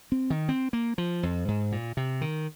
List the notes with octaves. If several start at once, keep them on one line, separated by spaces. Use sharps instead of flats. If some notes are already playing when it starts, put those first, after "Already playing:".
C4
D#3
C4
A#3
F3
F2
G#2
A#2
C3
D#3